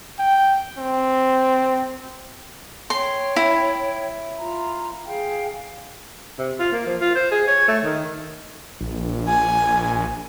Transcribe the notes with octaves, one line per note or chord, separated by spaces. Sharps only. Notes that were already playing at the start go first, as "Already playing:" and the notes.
G5
C4
C#5 G5 C6
E4
F4 A#5
G#4 F5 G5
C3
F4
A#3
F3
F4
C5
G#4
C#5
A3
D#3
A#1
G#5